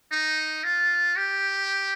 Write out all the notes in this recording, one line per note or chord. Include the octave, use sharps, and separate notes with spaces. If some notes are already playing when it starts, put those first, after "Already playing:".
D#4
F4
G4